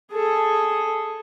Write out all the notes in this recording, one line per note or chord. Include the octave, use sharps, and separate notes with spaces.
G#4 A4